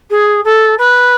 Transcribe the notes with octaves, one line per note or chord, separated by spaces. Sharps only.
G#4
A4
B4